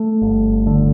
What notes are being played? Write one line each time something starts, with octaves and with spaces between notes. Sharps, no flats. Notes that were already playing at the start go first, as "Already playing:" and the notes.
Already playing: A3
G1
D3